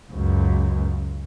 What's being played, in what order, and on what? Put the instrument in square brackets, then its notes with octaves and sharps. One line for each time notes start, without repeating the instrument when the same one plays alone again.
[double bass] C#2 F#2